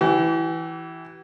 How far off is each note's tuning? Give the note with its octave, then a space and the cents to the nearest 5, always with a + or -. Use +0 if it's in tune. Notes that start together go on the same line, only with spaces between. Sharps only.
E3 +0 G4 -45